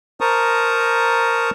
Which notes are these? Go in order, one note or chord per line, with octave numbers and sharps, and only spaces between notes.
A#4 C5 A5 A#5 C#6 D#6